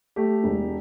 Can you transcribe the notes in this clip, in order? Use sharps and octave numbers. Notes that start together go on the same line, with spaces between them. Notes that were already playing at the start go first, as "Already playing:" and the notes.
A3 G4
E1